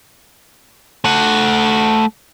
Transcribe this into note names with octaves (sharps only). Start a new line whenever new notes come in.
A3 F#5